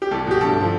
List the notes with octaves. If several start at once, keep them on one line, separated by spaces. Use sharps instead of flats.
G4
C2 A4
B2 G4
G2 A4
D3 F3